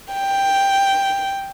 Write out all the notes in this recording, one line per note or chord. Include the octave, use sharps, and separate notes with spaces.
G5